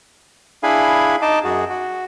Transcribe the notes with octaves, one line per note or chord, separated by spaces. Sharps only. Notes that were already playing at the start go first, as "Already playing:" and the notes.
D4 E4 G#4 F5 G#5 B5
D#4 D#5 A5 D6
F#2 F#4 G#4
F#4